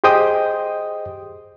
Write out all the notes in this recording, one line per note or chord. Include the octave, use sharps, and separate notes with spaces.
G4 G#4 C5 D#5 G5 D#6